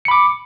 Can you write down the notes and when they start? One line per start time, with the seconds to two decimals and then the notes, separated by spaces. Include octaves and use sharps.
0.05 C#7
0.08 B5
0.11 D6